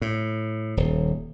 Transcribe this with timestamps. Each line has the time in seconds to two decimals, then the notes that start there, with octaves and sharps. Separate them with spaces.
0.02 A2
0.77 D#1